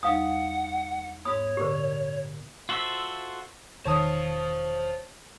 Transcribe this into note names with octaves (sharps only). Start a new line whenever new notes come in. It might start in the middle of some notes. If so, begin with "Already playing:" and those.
E2 G3 D#4 F5 F#5 D#6
G#2 B3 C#5 D#6
A#2 D3 G4 A#4
F4 F#4 A4 C5 E5
E1 D#3 C5 C#5 F5 A5 D#6